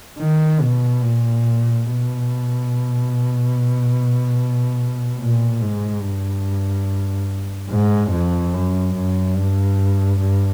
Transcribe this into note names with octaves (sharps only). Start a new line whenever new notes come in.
D#3
B2
A#2
B2
A#2
G#2
G2
G#2
F2
F#2
F#2
G2
G2